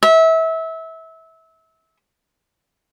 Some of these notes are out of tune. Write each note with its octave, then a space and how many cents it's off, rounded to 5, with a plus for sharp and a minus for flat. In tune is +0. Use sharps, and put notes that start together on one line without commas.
E5 -25